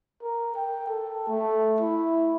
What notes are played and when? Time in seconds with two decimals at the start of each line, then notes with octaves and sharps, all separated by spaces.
0.23 A#4
0.56 G5
0.88 A4
1.28 A3
1.80 E4